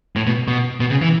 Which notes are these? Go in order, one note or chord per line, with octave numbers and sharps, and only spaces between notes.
A2
B2
B2
B2
C#3
E3